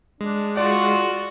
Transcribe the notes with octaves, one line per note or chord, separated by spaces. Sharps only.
G#3 D4
F4 F#4 D5